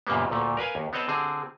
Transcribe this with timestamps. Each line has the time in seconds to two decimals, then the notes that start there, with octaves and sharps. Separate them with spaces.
0.07 F#2 A#2 C#3 G3 A#3 B3
0.30 D2 A#2 A3
0.57 A#4 B4 F5 G#5
0.75 D#2
0.93 B3 C4 C#5 D#5 F#5 A5
1.08 D3 C4 G#4